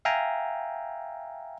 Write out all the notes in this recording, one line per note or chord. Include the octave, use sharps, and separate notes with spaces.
E5 F5 G5 G#5 A#5